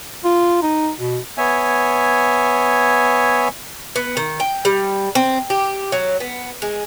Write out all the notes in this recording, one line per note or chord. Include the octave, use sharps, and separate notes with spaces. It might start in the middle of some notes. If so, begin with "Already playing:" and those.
F4
D#4
B2
B3 C#5 E5 G#5
B3
D#3
G5
G3
C4
G4
F#3
B3
G#3